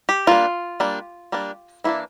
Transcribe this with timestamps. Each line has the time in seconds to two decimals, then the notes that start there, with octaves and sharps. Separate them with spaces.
0.09 G4
0.27 G3 A#3 D4 F4
0.80 G3 A#3 D4
1.32 G3 A#3 D4
1.84 E3 A#3 D4 E4